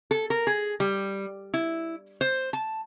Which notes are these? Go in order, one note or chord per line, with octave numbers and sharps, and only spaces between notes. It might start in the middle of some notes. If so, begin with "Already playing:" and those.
A4
A#4
G#4
G3
E4
C5
A5